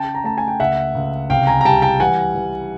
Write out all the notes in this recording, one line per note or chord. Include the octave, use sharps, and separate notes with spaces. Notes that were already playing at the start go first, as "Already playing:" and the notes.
Already playing: C#3 G5 A5
A#5
A3 A5
G#5
G5
C#2 E5 F#5
C#2
C2 F5 G5
G#5 A#5
A#5
G3 G5 A5
G5 A5
E3 F#5 G#5
E3